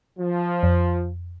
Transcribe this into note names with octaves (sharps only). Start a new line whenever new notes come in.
F3
F2